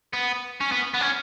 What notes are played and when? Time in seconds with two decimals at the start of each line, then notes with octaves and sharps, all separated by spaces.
0.13 B3
0.60 C#4
0.72 B3
0.94 B3
1.01 C#4